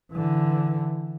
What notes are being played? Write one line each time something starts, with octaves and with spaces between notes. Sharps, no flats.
D3 E3